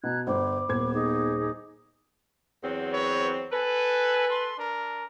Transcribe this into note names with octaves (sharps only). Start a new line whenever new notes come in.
B2 A#5 F#6 G#6
G1 C5 B5 D6
D#1 B3 C5 G#6
D#4 G#4 D6
E2 F#3 C4
B4 C#5
A4 B4 G#5
A4 C6
D4 A#4